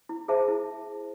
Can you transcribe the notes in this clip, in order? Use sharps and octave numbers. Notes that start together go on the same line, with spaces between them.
E4
G#4 C5 E5 A5
E4